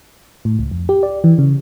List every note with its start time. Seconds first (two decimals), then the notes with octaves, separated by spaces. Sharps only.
0.45 A2
0.59 C#2
0.71 F2
0.89 G4
1.03 D5
1.24 E3
1.38 C#3